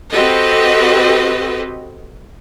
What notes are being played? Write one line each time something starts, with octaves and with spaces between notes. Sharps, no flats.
C4 F#4 G4 A4 B4 D#5